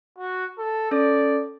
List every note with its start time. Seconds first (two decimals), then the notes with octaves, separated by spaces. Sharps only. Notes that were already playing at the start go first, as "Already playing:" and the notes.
0.18 F#4
0.58 A4
0.91 C#4 A4 D5